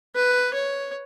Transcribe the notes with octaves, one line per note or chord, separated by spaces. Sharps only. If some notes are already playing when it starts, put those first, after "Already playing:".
B4
C#5